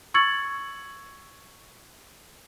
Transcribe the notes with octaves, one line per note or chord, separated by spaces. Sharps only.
C#6 E6 G#6 A6 C#7 F#7